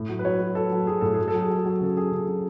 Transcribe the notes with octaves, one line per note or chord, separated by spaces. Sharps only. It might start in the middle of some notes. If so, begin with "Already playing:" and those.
Already playing: A2
F#3
B4
F#3 C#5
F#3
F#3 A4
F#3
F#3 G#4
A2 A4
F#3 G#4
A4
F#3
G#4
F#3
A4
F#3 G#4
C#3 A4
F#3 G#4
C#3
F#3